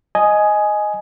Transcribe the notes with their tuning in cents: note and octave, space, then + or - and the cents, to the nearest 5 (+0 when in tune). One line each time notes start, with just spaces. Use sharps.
D#5 +0 G#5 +10